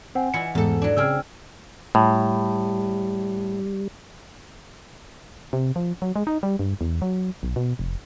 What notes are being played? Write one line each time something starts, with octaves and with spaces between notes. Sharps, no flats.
C4 F#5 G#5
E3 E4 F4 C#7
E2 G#2 A4
F#3 D4
C#3 C4 G#4 G5 E6 F6
A2 G3
C3
F3
F#3
G#3
D#4
G3
G2
E2
F#3
B1
B2
F1